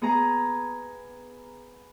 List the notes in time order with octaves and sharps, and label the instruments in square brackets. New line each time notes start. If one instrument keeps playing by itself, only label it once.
[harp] B3 G#4 A#5